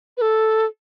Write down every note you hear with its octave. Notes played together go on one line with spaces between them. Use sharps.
B4
A4